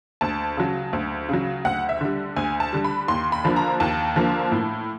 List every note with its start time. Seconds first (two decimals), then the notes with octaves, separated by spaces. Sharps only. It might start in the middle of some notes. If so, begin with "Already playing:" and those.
0.21 D2 A5
0.57 C#3 F#3
0.93 D2
1.29 C#3 F#3
1.65 D2 F#5
1.89 E5
2.01 D3 G3
2.36 D2 G#5
2.60 A5
2.73 D3 G3
2.84 B5
3.08 D#2 C6
3.32 B5
3.44 D3 F3 A#3
3.56 A#5
3.80 D#2 A5
4.16 D3 F3 A#3
4.52 A2